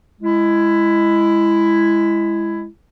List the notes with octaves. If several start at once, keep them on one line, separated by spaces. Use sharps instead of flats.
G#3 E4